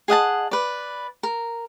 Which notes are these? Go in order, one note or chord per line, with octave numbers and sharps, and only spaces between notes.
G#4 D#5 F#5 A5
B4 D5
A#4